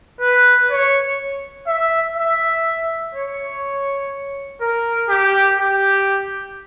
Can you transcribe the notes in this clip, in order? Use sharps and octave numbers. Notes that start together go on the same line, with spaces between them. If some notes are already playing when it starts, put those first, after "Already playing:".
B4
C#5
E5
E5
C#5
A#4
G4
G4